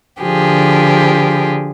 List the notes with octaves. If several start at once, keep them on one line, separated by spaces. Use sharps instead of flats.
D3 F3 G4 G#4